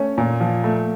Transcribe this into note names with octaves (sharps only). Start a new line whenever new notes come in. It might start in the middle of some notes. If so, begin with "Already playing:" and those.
Already playing: A3 C#4
A#2
F3
A3